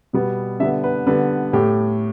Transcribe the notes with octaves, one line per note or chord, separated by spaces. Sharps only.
B2 G3 B3
D3 G3 B3 E5
B4
D3 G3 B3 B4
A2 A3 G4